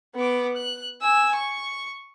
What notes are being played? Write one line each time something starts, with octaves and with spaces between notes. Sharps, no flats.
B3 D6
F#6
G#5 E6
C#6